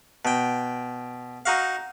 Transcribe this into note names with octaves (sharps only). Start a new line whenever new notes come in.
B2 G5
D#4 F#4 F5